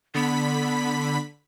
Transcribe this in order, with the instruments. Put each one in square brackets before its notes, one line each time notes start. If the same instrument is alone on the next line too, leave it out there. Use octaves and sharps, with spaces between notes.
[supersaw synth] D3 B5 B6 [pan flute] B3